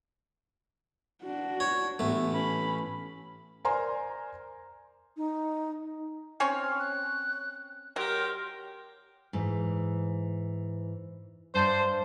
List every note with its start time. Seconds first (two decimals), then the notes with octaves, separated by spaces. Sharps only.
1.23 D4 F#4
1.60 C#5
1.99 A1 A3 B3
2.34 C#4 B5
3.65 A#4 C5 D5 G#5 A#5 C6
5.17 D#4
6.40 C4 C#4 C#5 F6
6.79 F#6
7.96 F#3 G4 A#4 C6
9.33 G#2 E3
11.54 G2 D4 C5